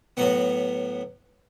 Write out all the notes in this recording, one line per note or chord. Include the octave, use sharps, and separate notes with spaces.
A2 F#3 B3 F#5